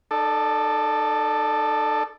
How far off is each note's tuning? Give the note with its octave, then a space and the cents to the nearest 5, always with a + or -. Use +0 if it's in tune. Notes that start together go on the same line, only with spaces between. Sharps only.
D#4 -35 A4 +0 D5 +0